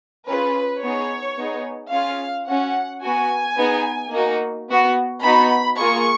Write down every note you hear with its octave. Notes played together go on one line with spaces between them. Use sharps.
C#4 F4 G#4 B4
B3 D#4 G#4 C#5
B3 D#4 G#4
C#4 F4 G#4 F5
C#4 F#4 F#5
B3 F#4 G#5
B3 D#4 G#4
A#3 D#4 F#4
B3 F#4
B3 D#4 F#4 B5
A#3 F4 G#4 C#6